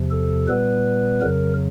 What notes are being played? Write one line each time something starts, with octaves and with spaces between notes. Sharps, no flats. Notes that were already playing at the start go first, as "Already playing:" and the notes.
Already playing: E2 C3 F3
A4
A#2 G3 B3 B4
F2 C#3 F#3 A#4